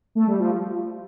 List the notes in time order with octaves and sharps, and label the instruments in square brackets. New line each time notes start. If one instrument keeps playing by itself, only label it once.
[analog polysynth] A3
G3
F3